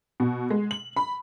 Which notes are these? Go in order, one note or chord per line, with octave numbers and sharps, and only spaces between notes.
B2
G#3
F#7
B5